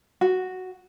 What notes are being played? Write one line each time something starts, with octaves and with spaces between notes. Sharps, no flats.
F#4